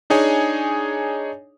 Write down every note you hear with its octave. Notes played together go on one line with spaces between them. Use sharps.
D4 D#4 G#4 C#5 G#5